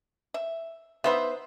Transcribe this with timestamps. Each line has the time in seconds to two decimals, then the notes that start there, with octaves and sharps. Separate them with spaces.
0.34 E5
1.04 B3 D#4 B4 C5 E5